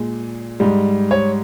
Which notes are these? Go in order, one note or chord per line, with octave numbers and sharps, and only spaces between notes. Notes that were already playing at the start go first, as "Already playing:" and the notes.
Already playing: A#2 G#3
G#2 G3
C#5